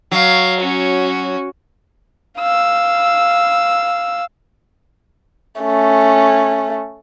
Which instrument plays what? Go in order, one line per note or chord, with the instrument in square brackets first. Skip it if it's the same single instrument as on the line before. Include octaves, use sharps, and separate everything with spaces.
[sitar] F#3 [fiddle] F5
[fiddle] C#4 F#4
[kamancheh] F5 E6
A3 C#4